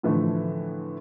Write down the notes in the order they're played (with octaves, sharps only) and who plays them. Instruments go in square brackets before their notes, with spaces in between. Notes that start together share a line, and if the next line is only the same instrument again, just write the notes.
[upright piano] A2 D3 E3 F3 A3